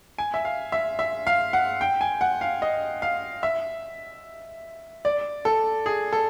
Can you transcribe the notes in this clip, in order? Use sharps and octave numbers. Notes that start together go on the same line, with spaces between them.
G#5
E5
F5
E5
E5
F5
F#5
G5
G#5
F#5
F5
D#5
F5
E5
D5
A4
G#4
A4